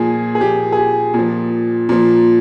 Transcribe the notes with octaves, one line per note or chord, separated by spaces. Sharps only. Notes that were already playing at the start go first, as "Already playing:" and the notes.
Already playing: A#2 F3 G#4
G#4
A#2 F3 G4
G#4
G4
A#2
F3
A#2 F3